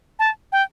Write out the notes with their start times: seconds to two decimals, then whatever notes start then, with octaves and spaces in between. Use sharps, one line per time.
0.19 A5
0.52 G5